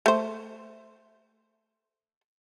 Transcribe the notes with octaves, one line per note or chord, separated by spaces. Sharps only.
A3 C5